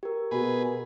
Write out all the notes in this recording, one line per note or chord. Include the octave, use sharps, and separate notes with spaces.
G4 A#4
B2 G#4 B4